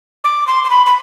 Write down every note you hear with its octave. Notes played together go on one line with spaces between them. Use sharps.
D6
C6
C6
B5
B5